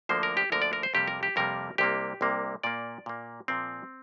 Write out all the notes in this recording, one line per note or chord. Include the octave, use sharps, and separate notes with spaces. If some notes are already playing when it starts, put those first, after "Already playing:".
D2 D3 F3 A#3 C5
A#4
G4
D2 D3 F3 A#3 A#4
D5
A#4
C5
F2 C3 G3 A#3 G4
A#4
G4
F2 C3 G3 A#3 A#4
C2 C3 A#3 G4
C2 C3 A#3
A#2 A#3 D5
A#2 A#3
A#2 F3 A#3 C4